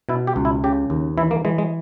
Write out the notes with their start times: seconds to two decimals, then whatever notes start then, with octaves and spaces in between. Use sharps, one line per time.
0.09 B2 E4
0.27 G4
0.36 C#2
0.45 E4
0.64 C#3 G4
0.90 D#2
1.18 E3 E4
1.31 A#3
1.45 E3 G#3
1.58 G#3